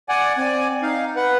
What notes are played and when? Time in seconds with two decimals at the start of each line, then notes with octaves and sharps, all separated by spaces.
0.09 D5 F#5 G#5
0.37 C4 D5 G#5
0.82 D#4 F5
1.16 B4 F#5